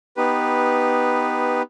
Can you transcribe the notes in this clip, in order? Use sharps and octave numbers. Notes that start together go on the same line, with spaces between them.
B3 D#4 G4 B4